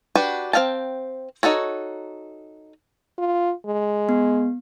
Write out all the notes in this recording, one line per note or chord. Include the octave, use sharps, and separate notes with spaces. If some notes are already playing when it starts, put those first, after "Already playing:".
D4 F#4 G4 B4
C4 G#4 F5 G5 A5
D#4 F#4 A4 C#5
F4
G#3
B3